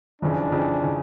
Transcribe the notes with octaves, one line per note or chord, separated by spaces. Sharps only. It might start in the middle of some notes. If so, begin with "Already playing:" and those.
F#1 F2 C#3 E3 D4
F#1 F2 C#3 E3
C#3 E3